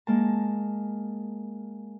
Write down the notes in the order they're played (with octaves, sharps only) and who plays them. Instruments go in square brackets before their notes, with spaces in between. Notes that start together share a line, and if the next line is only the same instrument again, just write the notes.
[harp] G#3 A#3 A5